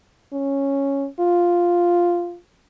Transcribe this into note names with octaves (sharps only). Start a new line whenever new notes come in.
C#4
F4